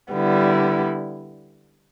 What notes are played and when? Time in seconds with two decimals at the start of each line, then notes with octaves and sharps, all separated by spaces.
0.12 D3 G3 B3 E4